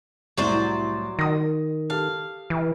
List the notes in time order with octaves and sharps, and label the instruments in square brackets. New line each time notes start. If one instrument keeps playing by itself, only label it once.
[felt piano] C2 A2 [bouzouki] F#3 C5 D5
[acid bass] D#3 [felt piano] D#6 A#6
[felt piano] G4 A4 A5 [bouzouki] F5
[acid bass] E3